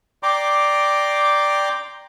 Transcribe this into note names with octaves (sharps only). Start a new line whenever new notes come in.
D5 G5 A#5 C6 D6